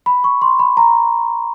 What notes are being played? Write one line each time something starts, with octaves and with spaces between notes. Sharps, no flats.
B5
C#6
C6
B5
A#5